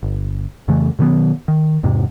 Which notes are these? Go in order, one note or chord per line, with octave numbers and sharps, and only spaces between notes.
G1
F2 C#3 E3 A3
B2 D#3 F#3 B3
D#3
E2 G#2 C3